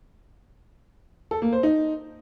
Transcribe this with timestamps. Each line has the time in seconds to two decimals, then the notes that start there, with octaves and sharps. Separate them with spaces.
1.31 A4
1.42 A#3
1.53 C5
1.63 D#4